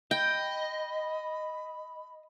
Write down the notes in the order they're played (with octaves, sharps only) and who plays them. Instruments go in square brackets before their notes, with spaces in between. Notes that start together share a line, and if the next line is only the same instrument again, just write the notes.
[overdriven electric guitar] D#5 [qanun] G5 [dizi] B5